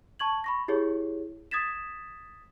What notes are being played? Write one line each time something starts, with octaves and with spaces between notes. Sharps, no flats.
A5 C#6 G#6 F#7
B5 C#6 A#6
E4 G4 G#4 C#5
D#6 G#6 A6 B6 E7